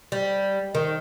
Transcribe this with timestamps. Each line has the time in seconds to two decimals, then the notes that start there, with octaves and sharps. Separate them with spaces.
0.12 G3
0.75 D#3